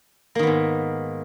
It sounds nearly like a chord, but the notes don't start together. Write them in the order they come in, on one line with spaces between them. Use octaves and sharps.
A#3 D#3 B3 G#2